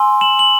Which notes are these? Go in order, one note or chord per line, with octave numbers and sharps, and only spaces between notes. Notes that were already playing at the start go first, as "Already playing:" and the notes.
Already playing: G#5 C6 E6
E7 F#7
F#7